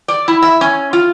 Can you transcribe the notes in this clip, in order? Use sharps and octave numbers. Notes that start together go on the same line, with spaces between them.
D5
E4
E5
C#4
F4